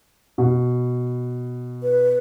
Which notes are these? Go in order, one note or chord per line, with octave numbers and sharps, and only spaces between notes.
B2
B4